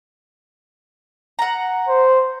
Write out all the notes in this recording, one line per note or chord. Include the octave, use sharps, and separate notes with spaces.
F#5 A#5
C5